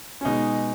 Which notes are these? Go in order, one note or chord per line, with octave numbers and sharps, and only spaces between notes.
C#4
B2 G#3 D#4